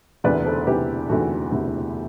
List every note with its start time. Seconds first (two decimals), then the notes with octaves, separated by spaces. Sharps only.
0.24 E1 D2 C3 E3 B4 D5
0.45 A4 C5
0.66 E1 D2 C3 E3 G4 B4
1.09 E1 D2 C3 E3 F#4 A4
1.51 E1 D2 C3 E3